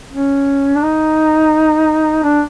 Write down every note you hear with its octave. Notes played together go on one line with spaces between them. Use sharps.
C#4
D4
D#4
D4